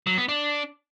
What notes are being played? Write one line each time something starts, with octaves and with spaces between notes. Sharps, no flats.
F#3
B3
D4